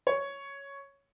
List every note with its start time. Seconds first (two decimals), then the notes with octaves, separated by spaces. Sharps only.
0.07 C#5